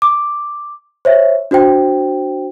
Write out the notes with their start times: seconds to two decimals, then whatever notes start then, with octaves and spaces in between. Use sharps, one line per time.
0.02 D6
1.05 C5 C#5 E5
1.51 D4 F#4 C5 G5